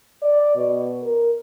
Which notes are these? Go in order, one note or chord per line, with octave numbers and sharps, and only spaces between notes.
D5
B2
A#4